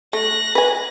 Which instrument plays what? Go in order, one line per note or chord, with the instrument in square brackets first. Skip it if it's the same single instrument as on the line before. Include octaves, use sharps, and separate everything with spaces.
[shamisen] A3 [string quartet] F#6 A#6
[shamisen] B4 G#5